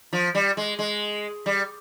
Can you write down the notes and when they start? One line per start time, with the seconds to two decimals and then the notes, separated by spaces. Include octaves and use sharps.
0.13 F3
0.35 G3
0.57 G#3
0.79 G#3
1.46 G3